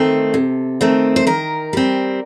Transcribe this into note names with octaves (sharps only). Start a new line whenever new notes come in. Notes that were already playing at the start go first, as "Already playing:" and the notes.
Already playing: D#3 A3 C4 A4
C3
D#3 A3 C4
C5
D#3 A#4
G3 C4